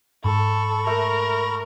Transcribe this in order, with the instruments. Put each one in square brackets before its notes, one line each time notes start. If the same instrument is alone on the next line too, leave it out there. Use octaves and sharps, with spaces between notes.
[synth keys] G#2 [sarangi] A4 [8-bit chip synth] B5 C#6
[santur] A3 [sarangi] A#4